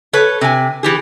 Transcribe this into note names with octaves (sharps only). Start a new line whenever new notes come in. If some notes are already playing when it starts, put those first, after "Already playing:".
A4 B4 C#5
C3 G#5
E3 G4 G#4